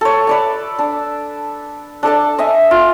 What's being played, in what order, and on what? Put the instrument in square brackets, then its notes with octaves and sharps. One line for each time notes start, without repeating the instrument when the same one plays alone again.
[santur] A4 C#5
B4 D5 A5
D4
D4 A4 D5 A5
D#5 E5 G#5
F4